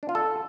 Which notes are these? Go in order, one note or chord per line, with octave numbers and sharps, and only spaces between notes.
D4
F4
A4